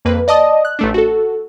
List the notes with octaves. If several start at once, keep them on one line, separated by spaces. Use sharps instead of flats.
F2 A#3 B4
D5 D#5 A5 D#6
F#6
A1 A3 D4
F#4 A4